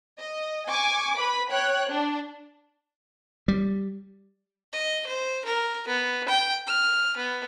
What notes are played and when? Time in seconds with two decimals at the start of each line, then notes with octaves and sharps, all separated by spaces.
0.19 D#5
0.68 G#5 C#6 D6
1.16 B4 B5
1.50 C#5 G5 F#6
1.90 D4
3.48 G3
4.73 D#5
5.07 C5
5.45 A#4
5.88 B3
6.29 G5
6.67 F6
7.17 B3